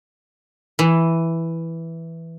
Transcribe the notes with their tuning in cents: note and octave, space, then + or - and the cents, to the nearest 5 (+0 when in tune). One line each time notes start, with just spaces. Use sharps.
E3 +0